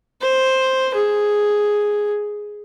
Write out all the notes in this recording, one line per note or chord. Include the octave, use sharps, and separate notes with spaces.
C5
G#4